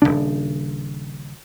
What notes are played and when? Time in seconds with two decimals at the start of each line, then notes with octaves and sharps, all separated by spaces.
0.02 D#1 C2 C#3 D4